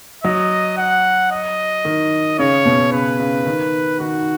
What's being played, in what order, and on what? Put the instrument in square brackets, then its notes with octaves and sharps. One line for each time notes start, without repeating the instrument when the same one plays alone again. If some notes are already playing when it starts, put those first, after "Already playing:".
[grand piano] F#3 [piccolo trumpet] D#5
[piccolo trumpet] F#5
D#5
[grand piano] D#3
[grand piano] C#3 [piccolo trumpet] C#5
[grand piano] B2
[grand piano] C#3 [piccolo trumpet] B4
[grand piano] C#3
D#3
[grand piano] D#3 [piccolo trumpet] F#4